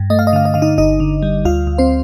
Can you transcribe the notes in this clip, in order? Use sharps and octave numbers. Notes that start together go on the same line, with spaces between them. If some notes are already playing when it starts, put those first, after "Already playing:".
Already playing: G2
A3 D#5
F5
D#5
D3 F5
D#5
D3 F5
D#4 D#5
G1 D#4 D#5
D3
G3
D2 F4 F5
D2
C4 C5